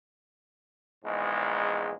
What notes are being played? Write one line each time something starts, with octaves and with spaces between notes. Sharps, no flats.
A#1 E2 G#2 G#3